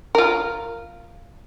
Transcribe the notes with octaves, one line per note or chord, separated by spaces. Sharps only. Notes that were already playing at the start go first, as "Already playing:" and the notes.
F4 A#4